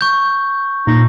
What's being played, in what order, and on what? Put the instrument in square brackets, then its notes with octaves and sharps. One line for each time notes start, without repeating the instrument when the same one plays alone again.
[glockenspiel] C#6 G6
[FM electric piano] A#2 [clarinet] D#4